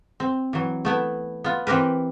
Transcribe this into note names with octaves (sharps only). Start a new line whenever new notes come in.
C4
E3 F#3
A3 B3 E4
B3 F4
E3 C4 G4 A#4 B4